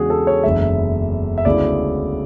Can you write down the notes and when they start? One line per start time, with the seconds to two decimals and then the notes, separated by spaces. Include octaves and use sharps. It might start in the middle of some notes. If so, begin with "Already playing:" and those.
Already playing: E2 C#3 G#3 D4 F#4 G#4
0.10 A4
0.27 C#5
0.43 F#1 E2 D3 G#3 E5
1.38 E5
1.45 D2 C#3 G#3 B3 E4 D5